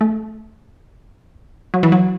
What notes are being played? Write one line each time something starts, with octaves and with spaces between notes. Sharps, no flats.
A3
F#3
E3
F#3